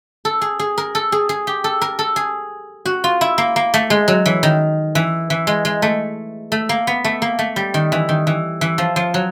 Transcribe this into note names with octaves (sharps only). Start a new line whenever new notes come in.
A4
G#4
G#4
A#4
A4
G#4
G#4
G4
A4
A#4
A4
G#4
F#4
F4
E4
A#3
A#3
A3
G#3
F#3
E3
D#3
E3
E3
G#3
G#3
A3
A3
A#3
B3
A3
A#3
A3
G3
D#3
E3
D#3
E3
E3
F3
F3
F#3